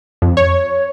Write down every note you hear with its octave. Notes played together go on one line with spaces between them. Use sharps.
F2
C#5